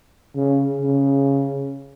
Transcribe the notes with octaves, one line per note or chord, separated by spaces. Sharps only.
C#3
C#3